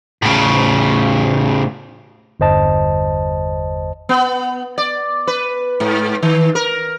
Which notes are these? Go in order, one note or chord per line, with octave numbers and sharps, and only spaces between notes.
A2 C#3
G1 E2 C5 D#5 A5
B3
D5
B4
G#2
D#3
A#4